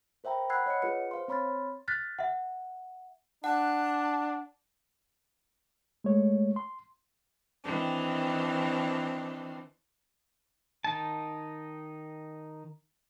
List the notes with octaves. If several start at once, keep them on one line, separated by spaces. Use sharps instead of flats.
A#4 C5 E5 G5 A#5 B5
F#5 B5 E6 F#6 G#6 C7
C#5 D#5 F#5 C#7
F4 G#4 B4 C#7
C5 F5 C6
C4 C#5 B5 C6 F6 A6
F6 F#6 A6 B6
E5 F#5
D4 F#5 A5
G#3 A3 C#5
C6
D#3 E3 C4 D4
D#3 D#4 A5